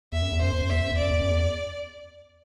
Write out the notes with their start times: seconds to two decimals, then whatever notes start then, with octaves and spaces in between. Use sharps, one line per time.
0.12 E2 E5
0.22 F#2
0.32 E2
0.41 F#2 C5
0.53 E2
0.62 F#2
0.70 E2 E5
0.81 F#2
0.92 E2
0.98 F#2 D5
1.11 E2
1.21 F#2
1.31 E2